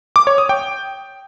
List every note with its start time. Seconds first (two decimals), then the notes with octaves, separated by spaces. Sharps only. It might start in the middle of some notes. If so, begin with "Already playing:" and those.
0.16 D6
0.27 C#5
0.38 D#6
0.49 G5